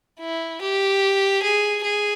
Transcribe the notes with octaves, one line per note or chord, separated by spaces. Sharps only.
E4
G4
G#4
G#4